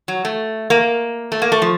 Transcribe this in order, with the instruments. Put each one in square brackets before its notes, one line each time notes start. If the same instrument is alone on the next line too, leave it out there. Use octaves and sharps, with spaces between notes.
[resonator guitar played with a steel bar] F#3
A3
A#3
A3
A#3
A3
F3